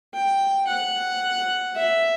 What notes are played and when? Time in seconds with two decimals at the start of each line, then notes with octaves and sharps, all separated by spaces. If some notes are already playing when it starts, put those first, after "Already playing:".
0.14 G5
0.67 F#5
1.75 E5